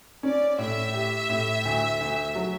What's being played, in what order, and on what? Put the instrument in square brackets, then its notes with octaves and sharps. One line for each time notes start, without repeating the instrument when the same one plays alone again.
[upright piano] C#4 [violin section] D5
[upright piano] A2 [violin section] E5
[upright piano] G4
A2
D2
D2
F#3